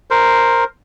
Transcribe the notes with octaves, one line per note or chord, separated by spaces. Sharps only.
A#4 C5